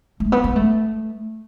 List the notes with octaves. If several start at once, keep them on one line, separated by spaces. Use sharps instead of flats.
A3
B3
B3
A3